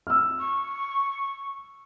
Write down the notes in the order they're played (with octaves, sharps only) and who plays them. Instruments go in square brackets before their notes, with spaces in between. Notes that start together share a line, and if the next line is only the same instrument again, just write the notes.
[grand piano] E6 F6
[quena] C#6